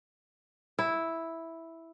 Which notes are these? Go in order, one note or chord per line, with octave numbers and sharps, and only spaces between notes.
E4